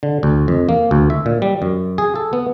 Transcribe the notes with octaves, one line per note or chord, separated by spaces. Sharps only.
D3
D2
F2
A#3
D2
E5
A#2
G3
F#2
G#4
A4
B3